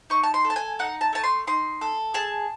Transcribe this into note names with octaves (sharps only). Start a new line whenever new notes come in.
D#4 C#6
A5
C6
A4
A5
G#5
D#4 F#5
A5
A3 A5
C6
D#4 C6
A4
G#4 A5